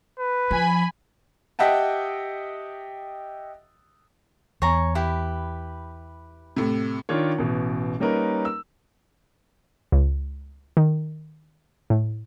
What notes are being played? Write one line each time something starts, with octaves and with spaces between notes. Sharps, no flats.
B4
F3 G#5 B5
G4 D#5 E5 F#5 G5 A5
E2 C#5 G#5 A#5
E4 G4 B4
A2 C3
D#3 D4 F4 C#5
A1 B2
G3 A#3 C#4 D#4 A#4 B4
E6
C#2
D#3
A2